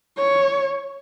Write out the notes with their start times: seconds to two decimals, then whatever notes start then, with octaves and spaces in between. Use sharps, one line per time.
0.18 C#5